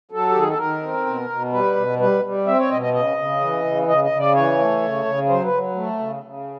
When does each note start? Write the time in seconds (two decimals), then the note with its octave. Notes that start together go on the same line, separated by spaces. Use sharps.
0.11 F#3 A4
0.29 G4
0.35 D#3 G#4
0.48 A4
0.58 D#3 A#4
0.83 C4
1.06 B2
1.30 B2
1.52 G3 B4
1.76 B2
2.00 G3 B4
2.23 G3
2.47 C4 E5
2.59 C#5
2.71 B2 D#5
2.82 D#5
2.93 C#3 D#5
3.17 C#3
3.41 E3
3.65 C#3
3.88 C#3 D#5
4.04 D#5
4.11 C#3
4.18 D5
4.34 E3 C#5
4.59 A3
4.82 C#3
5.05 C#3
5.29 F#3 C5
5.45 B4
5.53 F#3
5.75 A3
5.99 C#3
6.23 C#3